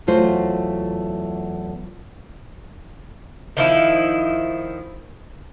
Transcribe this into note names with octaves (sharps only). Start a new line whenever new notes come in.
E2 F#3 A3 F4 F#4 C5
D#3 F3 E4